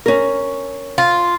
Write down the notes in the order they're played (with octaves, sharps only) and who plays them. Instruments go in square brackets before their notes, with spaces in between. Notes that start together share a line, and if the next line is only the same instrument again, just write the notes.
[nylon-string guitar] C#4 A#4
[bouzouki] F4